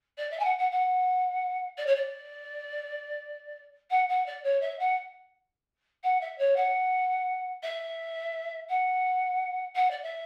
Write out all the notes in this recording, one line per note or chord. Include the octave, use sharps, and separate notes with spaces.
D5
E5
G#5
F#5
F#5
F#5
D5
C#5
D5
F#5
F#5
D5
C#5
E5
F#5
F#5
E5
C#5
F#5
E5
F#5
F#5
D5
E5